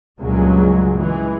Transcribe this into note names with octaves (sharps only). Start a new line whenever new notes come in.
C#2 G2 A#2 C#3 F#3 G#3
E3 G#3